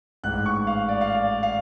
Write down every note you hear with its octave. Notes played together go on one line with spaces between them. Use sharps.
A1 G#2 F#6
C#6
F5
D5
F5
D5
F5